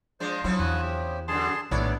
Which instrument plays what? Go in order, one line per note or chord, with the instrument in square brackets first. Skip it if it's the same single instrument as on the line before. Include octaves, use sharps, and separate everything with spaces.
[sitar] F3 G#3 D4 [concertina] C5
[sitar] F3 C#4 E4 [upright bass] F#3
[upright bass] E2 [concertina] F#4 G#5 F#6
[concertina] G4
[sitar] F#2 D3 [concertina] G#4 A5 C6
[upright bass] A#1 A2 [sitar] D#2 C#5 D5 [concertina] B3 D4 E4